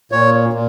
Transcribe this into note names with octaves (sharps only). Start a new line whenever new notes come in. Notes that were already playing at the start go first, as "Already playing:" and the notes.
A#2 C#5
A#2